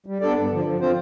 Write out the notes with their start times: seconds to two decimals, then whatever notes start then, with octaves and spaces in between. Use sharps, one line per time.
0.06 G3
0.21 B3 D4 A4 D5
0.36 G2
0.51 D3 F3
0.65 F3
0.80 C4 F4 C5